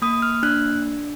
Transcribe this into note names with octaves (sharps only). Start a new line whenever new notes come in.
A#3 D#6
F6
D4 F#6